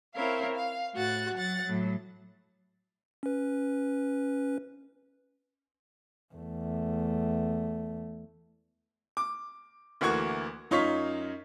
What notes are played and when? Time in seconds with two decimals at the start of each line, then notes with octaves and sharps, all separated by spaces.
0.15 C4 E4 A#4 C#5 F5
0.55 F5
0.94 A2 F#4 F#6 A6
1.34 F#3 F#5 A6
1.65 A2 F#3
3.23 C#4 B4
6.35 E2 A3
9.17 D6
10.01 D2 E3 A#3 F#4 C#6 G#6
10.71 F#2 D#4 F4 C#5 C#6 B6